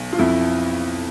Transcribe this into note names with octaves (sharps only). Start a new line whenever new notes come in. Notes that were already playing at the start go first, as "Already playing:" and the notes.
Already playing: B1
F4
F2 E4